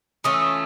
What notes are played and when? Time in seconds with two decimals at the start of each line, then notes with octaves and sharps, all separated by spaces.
0.24 E3 A3 C#4 F4 D#6
0.34 E6
0.42 D#6